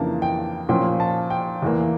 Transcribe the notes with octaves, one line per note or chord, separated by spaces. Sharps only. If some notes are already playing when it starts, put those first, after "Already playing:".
Already playing: F2 C#3 E3 A#3 D4 A5
G5
A#2 F3 C#4 G5
A5
G5
E2 E3 A#3